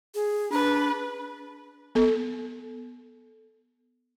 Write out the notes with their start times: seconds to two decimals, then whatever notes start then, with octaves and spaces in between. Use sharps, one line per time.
0.15 G#4
0.52 D4 B4
1.95 B3 A4